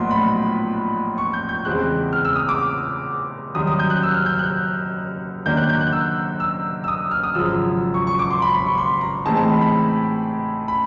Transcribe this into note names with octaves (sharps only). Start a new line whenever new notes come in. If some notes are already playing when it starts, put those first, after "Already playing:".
Already playing: A#1 A2 F#3 B3 D#4 C6
B5
C#6
G6
G6
E2 C#3 E3 G#3 C4 F#6
F6
E6
D#6
D6
F#2 D#3 G3 D#6
D#6
G6
F#6
E6
F6
G6
F#6
F#2 D#3 F#3 A#3 D4 G6
F#6
G6
F#6
E6
E6
E6
D#6
F6
D#6
G#1 F#2 C#3 F3 E6
C#6
C#6
D6
C6
B5
B5
C#6
C6
A#5
A2 E3 G#3 C4 D#4 A5
A5
B5
B5
B5